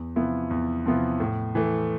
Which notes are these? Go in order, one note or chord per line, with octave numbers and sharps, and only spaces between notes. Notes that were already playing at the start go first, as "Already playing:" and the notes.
Already playing: E2
C3 F3 B3 E4
E2
C3 F3 B3 E4
A2
E3 A3